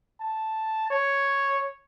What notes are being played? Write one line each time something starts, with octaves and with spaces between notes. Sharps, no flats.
A5
C#5